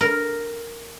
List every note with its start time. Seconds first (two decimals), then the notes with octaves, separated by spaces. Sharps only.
0.01 A#4